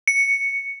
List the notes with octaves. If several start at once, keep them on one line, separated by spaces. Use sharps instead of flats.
C#7